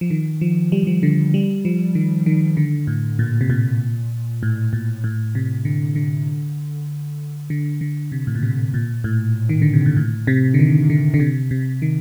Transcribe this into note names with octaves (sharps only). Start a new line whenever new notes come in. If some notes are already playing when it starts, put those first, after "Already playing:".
F3
D#3
F3
G3
G3
F3
D3
G3
F3
D#3
D#3
D3
A2
A#2
C3
A#2
A2
A#2
A2
C3
D3
D3
D3
D3
C3
A2
A#2
C3
A#2
A2
D#3
D3
C3
A#2
A2
C3
D3
D#3
D3
D3
C3
C3
D#3